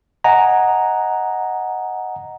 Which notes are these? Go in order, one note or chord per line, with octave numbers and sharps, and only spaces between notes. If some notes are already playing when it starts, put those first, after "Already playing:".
D#5 F#5 G#5 A#5